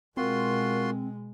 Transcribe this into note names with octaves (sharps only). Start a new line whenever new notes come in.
B2 G#3 C4 F4 F#4 A#4 C6